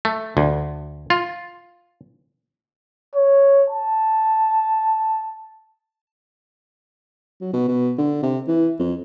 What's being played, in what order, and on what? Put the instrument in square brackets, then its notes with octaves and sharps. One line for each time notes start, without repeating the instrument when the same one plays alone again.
[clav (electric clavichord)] A3
D2
F4
[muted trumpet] C#5
A5
[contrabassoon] F#3
B2
B2
D3
C3
E3
F2